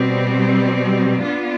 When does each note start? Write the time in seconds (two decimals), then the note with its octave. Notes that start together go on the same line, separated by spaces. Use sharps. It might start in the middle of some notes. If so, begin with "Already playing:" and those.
Already playing: B2 G3 C4
1.25 B3 D4 F4